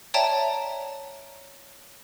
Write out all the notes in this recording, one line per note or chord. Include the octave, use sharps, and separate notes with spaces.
C#5 D5 E5 G5 A5 A#5